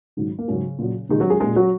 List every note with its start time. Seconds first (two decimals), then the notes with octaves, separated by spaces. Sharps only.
0.17 G#2 D#3 F#3 D#4
0.39 A#3
0.48 G#2 C#3 F#3 C#4
0.79 A#2 F#3
1.09 A#2 D#3 G#3 D#4
1.20 F#3 F#4
1.30 G#3 G#4
1.40 A#2 G#3 G#4
1.56 F#3 F#4